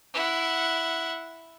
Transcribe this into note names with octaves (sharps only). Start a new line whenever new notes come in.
E4 F#5